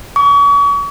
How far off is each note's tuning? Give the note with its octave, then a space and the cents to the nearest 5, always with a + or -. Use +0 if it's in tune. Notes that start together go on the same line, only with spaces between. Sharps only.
C#6 +40